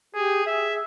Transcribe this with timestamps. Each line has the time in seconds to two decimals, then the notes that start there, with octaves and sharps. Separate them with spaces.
0.15 G4 G#4
0.46 G#4 E5